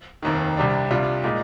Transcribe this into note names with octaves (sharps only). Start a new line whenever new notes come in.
F1 D#2 D#3
C2 C3 G3 D4
C2 C3 G3 D4 F4
A#2 G#3 D#4